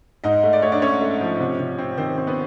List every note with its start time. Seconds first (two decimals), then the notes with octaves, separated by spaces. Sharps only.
0.24 G#2 D#4 D#5
0.43 A3
0.53 D5
0.62 A3 C#5
0.72 D4 D5
0.82 A3 C#4 C#5
1.01 A3
1.21 F3
1.40 C3
1.59 C3
1.78 C4
1.98 D#3 C4 C5
2.18 C4
2.27 B3 B4